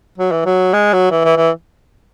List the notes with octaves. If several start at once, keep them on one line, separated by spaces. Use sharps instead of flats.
F#3
E3
F#3
G#3
F#3
E3
E3
E3